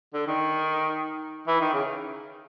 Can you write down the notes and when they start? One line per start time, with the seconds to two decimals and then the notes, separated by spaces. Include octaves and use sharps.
0.14 D3
0.27 D#3
1.47 E3
1.60 D#3
1.73 C#3